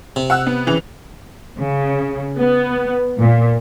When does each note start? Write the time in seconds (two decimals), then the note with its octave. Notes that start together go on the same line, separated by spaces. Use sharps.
0.16 C3
0.30 F#5 E6 F#6
0.47 B3
0.66 C#3 E3 F7
1.58 C#3
2.39 B3
3.18 A#2